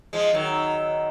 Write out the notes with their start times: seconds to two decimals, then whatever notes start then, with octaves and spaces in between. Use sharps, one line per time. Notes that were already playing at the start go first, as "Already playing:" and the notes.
0.13 F3 G#3
0.33 D#3 F#3